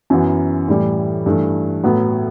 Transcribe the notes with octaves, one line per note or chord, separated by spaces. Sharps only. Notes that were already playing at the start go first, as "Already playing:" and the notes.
F#2 E3 B3 F#4
A2 E3 G3
G2 E3 A3
A2 F#3 B3